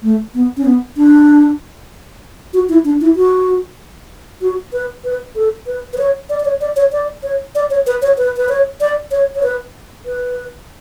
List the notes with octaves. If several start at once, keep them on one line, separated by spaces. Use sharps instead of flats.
A3
B3
C#4
B3
D4
F#4
E4
D4
E4
F#4
F#4
B4
B4
A4
B4
B4
C#5
D5
D5
C#5
D5
C#5
D5
C#5
D5
C#5
B4
C#5
B4
B4
C#5
D5
C#5
C#5
B4
B4